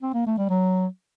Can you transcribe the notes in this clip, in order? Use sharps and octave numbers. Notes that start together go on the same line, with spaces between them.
C4
A#3
A3
G3
F#3